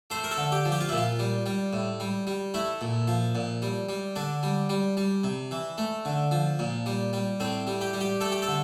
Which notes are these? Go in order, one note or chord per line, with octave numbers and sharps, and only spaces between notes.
A3 C5
A#4
A4
D3
G4
F3
G4
F4
A#2 E4
F4
G3
G3
A2
G3
G3
A3 E4
A#2
F3
A#2
G3
G3
D3 D4
G3
G3
G3
C3
E3
A3
D3
F3
A#2
G3
G3
A2 C4
G3
G4
G3
G4
A3 A4
G4
A4
D3